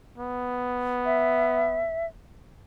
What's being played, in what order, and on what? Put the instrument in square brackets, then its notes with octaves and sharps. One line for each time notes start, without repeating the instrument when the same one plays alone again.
[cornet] B3
[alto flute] E5